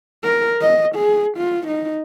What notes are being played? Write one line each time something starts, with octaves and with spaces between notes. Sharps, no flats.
A#4
D#5
G#4
F4
D#4